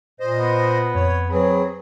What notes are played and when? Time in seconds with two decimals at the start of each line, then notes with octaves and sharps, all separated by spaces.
0.20 A#2 C5 D#5
0.39 B3
0.95 F2 C#5
1.30 F#3 C4 G#4 B4 B5